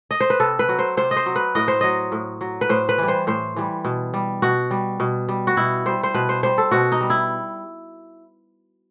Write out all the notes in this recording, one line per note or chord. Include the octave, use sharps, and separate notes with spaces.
D#5
C5
B4
C3 A4
B4
F#3
C5
C3 C5
D#5
C5
F#3
B4
A2 D#5
C5
F#3 D#5
A2
F#3
B4
A2 C5
B4
E3 G3
C5
A2 C5
E3 G3
B2
G3
B2 F#4
G3
B2
G3
F#4
B2 E4
G3 C5
C5
B2 B4
C5
G3 C5
A4
B2 F#4
D#4
G3
E4